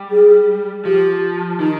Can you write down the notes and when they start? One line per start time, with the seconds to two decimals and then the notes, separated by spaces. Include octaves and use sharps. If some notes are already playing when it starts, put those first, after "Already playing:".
Already playing: G3
0.11 G#4
0.85 F3 G4
1.59 D#3 D#4